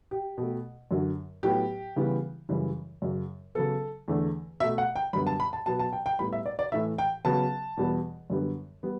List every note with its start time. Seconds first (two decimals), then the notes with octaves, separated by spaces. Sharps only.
0.11 G4
0.38 B2 A3
0.91 F#2 D3 F#3
1.43 A2 F#3 B3 G4
1.96 C#3 E3 G3 B3
2.49 F#2 C#3 E3 G3
3.02 F#2 C#3 F#3
3.55 C#3 F#3 B3 A4
4.08 E2 D3 A3
4.60 B2 A3 E5
4.78 F#5
4.96 G5
5.13 F#2 D3 G3 B3 B5
5.27 A5
5.40 B5
5.53 A5
5.66 B2 F#3 B3 A5
5.79 A5
5.93 G5
6.06 G5
6.19 A2 G3 B3 B5
6.33 E5
6.46 D5
6.59 D5
6.72 A2 E3 A3 E5
6.98 G5
7.25 C#3 F#3 B3 A5
7.77 E2 B2 G3 B3
8.30 F#2 D3 G3 B3
8.83 G3 B3